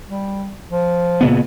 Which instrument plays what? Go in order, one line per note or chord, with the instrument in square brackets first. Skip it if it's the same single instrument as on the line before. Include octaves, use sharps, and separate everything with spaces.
[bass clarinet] G3
F3
[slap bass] A#2 C#3 B3